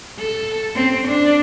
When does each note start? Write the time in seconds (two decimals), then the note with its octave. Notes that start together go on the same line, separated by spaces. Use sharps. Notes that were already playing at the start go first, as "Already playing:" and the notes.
0.19 A4
0.75 C4
1.08 D4